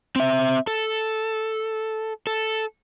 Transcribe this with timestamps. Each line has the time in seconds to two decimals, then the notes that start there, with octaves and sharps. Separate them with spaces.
0.16 C4 E5
0.67 A4
2.27 A4